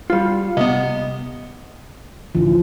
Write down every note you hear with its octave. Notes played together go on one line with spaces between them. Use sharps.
G3 F4
C3 B3 D#5
A1 D2 E3 F3